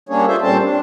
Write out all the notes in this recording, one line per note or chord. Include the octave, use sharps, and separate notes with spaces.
G3 A#3 C#4 D4 G#4 C#5
F4 A4 C5 E5
A#2 G3 C4 C#4 C5 A5
D4